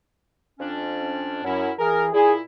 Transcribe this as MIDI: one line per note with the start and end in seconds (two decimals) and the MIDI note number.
0.59 1.40 41
0.59 1.40 61
0.59 1.40 62
1.44 1.69 42
1.44 1.72 54
1.44 1.72 61
1.44 1.72 64
1.79 2.10 52
1.79 2.10 68
1.79 2.06 70
2.13 2.40 46
2.13 2.40 64
2.13 2.33 68